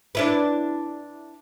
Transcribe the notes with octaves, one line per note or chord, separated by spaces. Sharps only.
D4 E4 B4